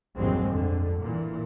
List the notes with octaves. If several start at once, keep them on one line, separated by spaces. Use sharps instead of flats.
A#1 E2 G2 F#3 G#3 C4
F2 D3
A#2 E3